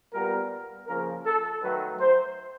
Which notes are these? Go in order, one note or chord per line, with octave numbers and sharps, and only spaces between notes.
A#2 G3 B3 A#4
C#3 F3 A#3 A#4
A4
D#3 F#3 A3 B4
C5